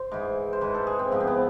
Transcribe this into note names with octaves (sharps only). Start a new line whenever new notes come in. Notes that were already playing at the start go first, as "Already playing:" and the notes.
Already playing: C5
G#2 E3
C5
G#2 E3 B4
A4
G#4
C4
G#2 F3 B3
C4
B3